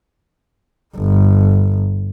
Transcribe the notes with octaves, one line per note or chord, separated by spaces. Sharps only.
G1